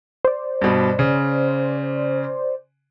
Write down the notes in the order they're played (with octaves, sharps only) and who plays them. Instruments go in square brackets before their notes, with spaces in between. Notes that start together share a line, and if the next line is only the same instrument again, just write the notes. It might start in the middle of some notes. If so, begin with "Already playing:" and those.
[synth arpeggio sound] C5 D5
[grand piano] G2 B2
C#3